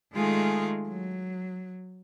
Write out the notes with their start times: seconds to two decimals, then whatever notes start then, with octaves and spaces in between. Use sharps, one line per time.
0.14 D#3 G#3 A3 F4 G#4
0.88 F#3